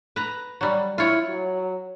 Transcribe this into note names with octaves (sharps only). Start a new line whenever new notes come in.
B4 A#5
F#3 G3
E4 F4 C#5
F#3